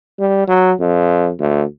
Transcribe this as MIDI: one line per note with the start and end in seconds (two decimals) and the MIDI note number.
0.19 0.43 55
0.48 0.72 54
0.80 1.31 41
1.39 1.63 38